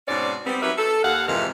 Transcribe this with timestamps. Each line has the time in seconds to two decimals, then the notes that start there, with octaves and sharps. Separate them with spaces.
0.08 G#2 B2 C4 C#4 D5
0.46 G3 B3 C4
0.62 F#3 D#4 G4 A#4 B4 E5
0.78 A4
1.03 D#2 F5 F#5
1.28 F2 G#2 C3 D#3 E3 F5